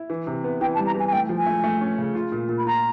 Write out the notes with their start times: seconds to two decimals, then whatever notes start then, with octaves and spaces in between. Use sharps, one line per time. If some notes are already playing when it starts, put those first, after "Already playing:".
Already playing: E4
0.10 E3
0.27 C3
0.44 B3
0.61 E3 G5
0.75 A5
0.79 G3
0.86 A#5
0.95 E3 G#5
1.07 G#5
1.12 A3 G5
1.29 F3
1.38 G#5
1.46 A3
1.64 A3
1.81 C#4
1.98 C#3
2.15 F4
2.32 A#2
2.49 A#2
2.58 B5
2.66 F4 A#5